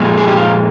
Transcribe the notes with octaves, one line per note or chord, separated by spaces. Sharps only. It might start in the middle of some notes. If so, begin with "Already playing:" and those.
Already playing: A#2 F3 G#3
G#4
G4
F4